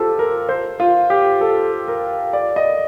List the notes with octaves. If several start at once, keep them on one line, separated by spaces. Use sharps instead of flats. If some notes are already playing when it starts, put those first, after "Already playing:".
Already playing: F4 G4 A4 C5
A#4
C5
F4
G4
A4
A#4
D5
D#5